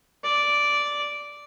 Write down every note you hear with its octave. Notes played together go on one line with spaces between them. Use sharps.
D5